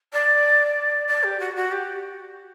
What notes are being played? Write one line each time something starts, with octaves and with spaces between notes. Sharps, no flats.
D5
D5
G4
F#4
F#4
G4